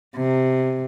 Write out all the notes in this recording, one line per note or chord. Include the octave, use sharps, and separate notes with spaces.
C3